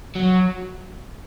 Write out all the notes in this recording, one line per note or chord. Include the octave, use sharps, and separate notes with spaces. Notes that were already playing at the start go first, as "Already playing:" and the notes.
F#3